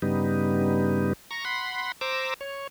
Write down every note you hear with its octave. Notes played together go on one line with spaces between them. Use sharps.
G2 C#3 G3 B3 D#4
A#5 C#6
F#5 B5 C6
C5 A#5 D6 E6
C#5